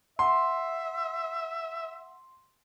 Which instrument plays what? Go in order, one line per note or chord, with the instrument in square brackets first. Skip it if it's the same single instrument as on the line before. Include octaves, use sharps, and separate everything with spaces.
[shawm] E5 [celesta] F#5 [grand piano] C6